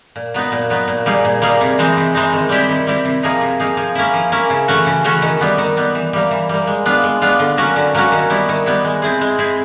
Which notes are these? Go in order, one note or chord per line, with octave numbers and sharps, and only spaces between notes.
A#2
F#3 B3 D#4
A#2
F#3 B3 D#4
A#2
G3 A#3 D#4 G#4
A#2
G3 A#3 D#4 G#4
C3
E3 G#3 C4 D#4
C3
E3 G#3 C4 D#4
D#3
G3 C4 E4 G4
D#3
G3 C4 E4 G4
C3
F3 A#3 D#4 G#4
C3
F3 A#3 D#4 G#4
F3
A#3 C#4 E4
F3
A#3 C#4 E4
C#3
E3 A3 C#4 F#4
C#3
E3 A3 C#4 F#4
D#3
G3 B3
D#3
G3 B3
E3
G3 A#3
E3
G3 A#3
G#3
B3 D4 F4
G#3
B3 D4 F4
D3
F#3 A#3 C#4 F#4
D3
F#3 A#3 C#4 F#4
D#3
G3 B3 E4
D#3
G3 B3 E4
G#3
C4 E4 G#4
G#3
C4 E4 G#4